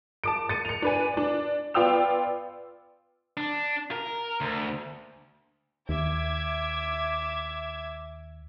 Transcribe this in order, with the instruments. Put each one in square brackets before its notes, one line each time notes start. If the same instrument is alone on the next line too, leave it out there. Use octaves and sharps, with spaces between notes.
[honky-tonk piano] A5 D6 D7
A6 C#7 D#7
C#7 F7
D4 B4 G#5
D4 D5
B3 F4 D5 G5 E6 F7
[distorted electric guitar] D4
A#4
D2
[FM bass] D#2 [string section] E5 D6 G#6